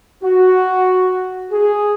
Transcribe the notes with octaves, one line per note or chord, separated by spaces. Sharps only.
F#4
G#4